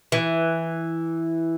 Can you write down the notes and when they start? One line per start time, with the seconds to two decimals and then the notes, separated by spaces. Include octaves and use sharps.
0.12 E3